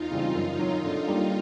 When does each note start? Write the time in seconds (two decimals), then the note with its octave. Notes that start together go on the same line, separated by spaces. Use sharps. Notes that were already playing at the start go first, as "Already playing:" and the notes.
Already playing: E2 D#4 F4
0.11 C#3 E3 G3 C4
0.35 F#2
0.59 D#3 F#3
0.84 D3
1.08 G3 A#3